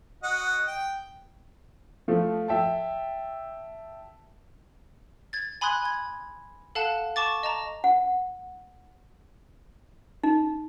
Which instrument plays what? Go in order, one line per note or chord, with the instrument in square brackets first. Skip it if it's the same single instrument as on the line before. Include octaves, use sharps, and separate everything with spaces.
[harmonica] F#4 D#5 F#5
G5
[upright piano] F3 A3
E5 G5 A5
[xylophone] G#6 A6
G#5 B5 C6 D#6 F#6 G#6
G#6
A4 F5 F#5 A5 F#6
A5 C#6 D6 A6
D#5 A5 A#5
[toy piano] F#5
D#4